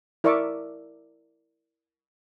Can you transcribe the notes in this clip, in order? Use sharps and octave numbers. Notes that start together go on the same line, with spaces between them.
E4 A#4 D5 E5 C#6 D6